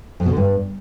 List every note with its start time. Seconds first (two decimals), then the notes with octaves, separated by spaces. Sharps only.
0.20 F2
0.26 B2
0.31 D3
0.37 G2